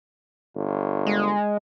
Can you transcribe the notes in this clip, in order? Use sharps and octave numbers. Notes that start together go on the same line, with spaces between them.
G1
G#3